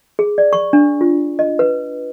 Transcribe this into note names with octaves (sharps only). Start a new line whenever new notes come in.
G#4
D5
C#6
D4
F4
D#5
B4